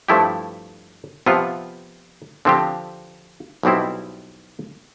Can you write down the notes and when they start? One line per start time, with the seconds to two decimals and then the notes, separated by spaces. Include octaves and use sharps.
0.08 G2 F3 A3 E4 G4
1.26 C3 F3 B3 F4
2.45 D3 F3 C4 G4
3.63 B1 B2 G3 C4 E4